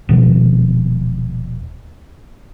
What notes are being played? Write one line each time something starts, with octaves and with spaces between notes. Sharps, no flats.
D#1 B2 F3